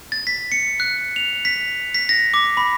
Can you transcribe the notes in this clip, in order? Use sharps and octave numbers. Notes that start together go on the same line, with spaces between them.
A6
B6
C#7
F#6
F7
B6
B6
A#6
D6
B5